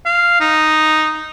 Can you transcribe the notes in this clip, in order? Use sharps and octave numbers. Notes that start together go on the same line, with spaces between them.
F5
D#4